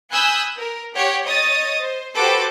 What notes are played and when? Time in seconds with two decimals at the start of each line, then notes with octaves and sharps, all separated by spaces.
0.12 G#5 B5 D#6 E6 F#6 G6
0.57 A#4
0.95 G4 C#5 F#5
1.25 C#5 D#5 D#6 A6
1.80 C5
2.15 F#4 G4 A4 B4 C5 D6